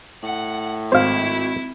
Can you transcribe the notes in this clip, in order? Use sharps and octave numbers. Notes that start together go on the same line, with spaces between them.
A2 F#5
G#1 E4 C5 F5